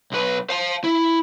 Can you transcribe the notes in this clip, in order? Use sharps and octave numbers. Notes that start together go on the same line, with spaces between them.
B1 B4
F5 A5
E4